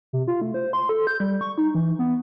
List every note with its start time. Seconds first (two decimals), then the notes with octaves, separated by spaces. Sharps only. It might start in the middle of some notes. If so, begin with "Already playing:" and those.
0.13 C3
0.28 F4
0.42 A3
0.54 C5
0.73 C6
0.89 A4
1.07 G6
1.20 G3
1.41 C#6
1.58 D#4
1.75 E3
1.99 B3